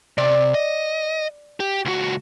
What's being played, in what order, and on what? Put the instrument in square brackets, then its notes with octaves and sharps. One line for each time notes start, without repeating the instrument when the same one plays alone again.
[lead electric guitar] C3 [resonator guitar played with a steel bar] D5
[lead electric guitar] D#5
G4
C#2 F#4